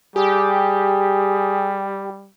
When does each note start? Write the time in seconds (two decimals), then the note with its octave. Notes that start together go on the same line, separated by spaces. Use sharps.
0.16 G3 G4 G#4